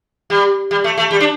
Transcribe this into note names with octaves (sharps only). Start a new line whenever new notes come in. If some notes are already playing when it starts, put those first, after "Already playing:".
G3
G3
A3
A3
G3
D4